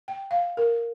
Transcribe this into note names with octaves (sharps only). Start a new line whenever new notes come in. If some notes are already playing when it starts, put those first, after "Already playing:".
G5
F5
A#4